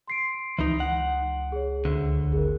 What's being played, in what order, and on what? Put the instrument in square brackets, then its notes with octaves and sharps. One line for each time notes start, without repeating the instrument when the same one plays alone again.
[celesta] C6 C7 D7
[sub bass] C#2 [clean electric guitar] E3 D#4
[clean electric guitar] F#5
[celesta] G#4 C#5
[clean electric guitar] D2 D3
[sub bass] G#1 [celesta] G#4 A#4